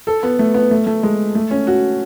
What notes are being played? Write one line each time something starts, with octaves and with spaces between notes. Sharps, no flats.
A4
B3
A3
B3
A3
A3
G#3
A3
C#4
F#4